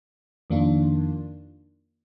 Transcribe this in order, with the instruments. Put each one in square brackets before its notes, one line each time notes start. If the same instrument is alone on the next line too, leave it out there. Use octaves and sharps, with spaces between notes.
[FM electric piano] F2 D#3 A#3 D4 F4